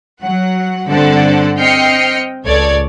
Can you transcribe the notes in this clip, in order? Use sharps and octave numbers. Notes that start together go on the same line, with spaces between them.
F#3 F#5
G2 D3 C4 A4 D5 F#5
C4 D#5 G5 F6 C7 C#7
C#2 A4 C#5 D5 G#6